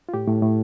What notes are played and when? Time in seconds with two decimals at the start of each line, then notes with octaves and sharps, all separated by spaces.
0.09 F4
0.14 A2 G4
0.28 A2
0.42 A2